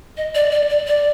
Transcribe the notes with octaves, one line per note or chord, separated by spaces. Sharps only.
D#5
D5
D5
D5
D5